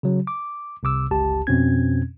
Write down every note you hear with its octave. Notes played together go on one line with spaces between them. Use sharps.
C#3 F#3
D6
C2 C3 D6 E6
G1 C#2 G4 A5
F2 B2 C4 C#4 G#6